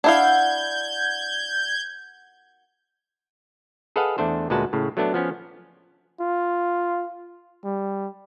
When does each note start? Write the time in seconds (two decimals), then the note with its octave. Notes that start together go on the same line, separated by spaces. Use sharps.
0.04 D4 E4 F5 F#5 G6 G#6
3.96 G#4 A4 B4 D#5 F5 F#5
4.18 E2 A3 D4 C5
4.50 D2 A#2 G#3 F#4 B4 A5
4.73 A2 C#3
4.97 F#3 A3 B3 D4
5.14 F3 B3 C#4
6.20 F4
7.64 G3